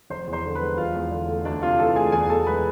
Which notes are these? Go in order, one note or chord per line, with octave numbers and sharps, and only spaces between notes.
F1 C5 C6
E2
C5 C6
D3
B4 B5
G#3
E1 F4 F5
E2
D3
A3
D2 D4 D5
C3 F4 F5
E3 A4 A5
D2 G#4 G#5
E2 G#4 G#5
B2 A4 A5
G#3 B4 B5